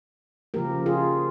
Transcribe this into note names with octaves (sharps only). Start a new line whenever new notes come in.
C#3 F3 A#3 G4 A#4
F4 G#4